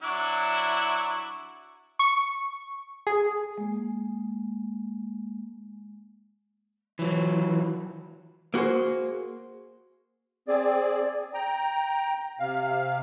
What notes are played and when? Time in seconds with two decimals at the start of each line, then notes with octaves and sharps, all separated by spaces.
0.03 F#3 D4 E4
1.99 C#6
3.07 G#4
3.58 G#3 A#3
6.99 E3 F#3
8.54 A#3 F#4 G#4 C5
10.48 C4 G#4 D5
11.34 G5 A#5
12.40 C3 F5